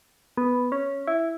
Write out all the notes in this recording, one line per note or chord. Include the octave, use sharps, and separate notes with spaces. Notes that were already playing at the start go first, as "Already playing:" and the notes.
B3
C#4
E4